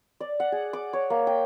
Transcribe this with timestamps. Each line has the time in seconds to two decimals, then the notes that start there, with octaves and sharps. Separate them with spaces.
0.20 D5
0.40 F#5
0.52 G#4
0.73 D6
0.93 C#5
1.10 A#3
1.27 G5